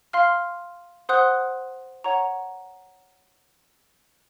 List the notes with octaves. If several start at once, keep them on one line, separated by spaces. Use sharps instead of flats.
F5 C6 F6
C5 F#5 C6 D#6 F#6
C#5 F#5 A#5 C#6